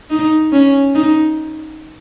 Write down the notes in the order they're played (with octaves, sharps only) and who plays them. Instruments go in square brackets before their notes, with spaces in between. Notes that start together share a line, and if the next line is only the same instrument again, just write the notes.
[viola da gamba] D#4
C#4
D#4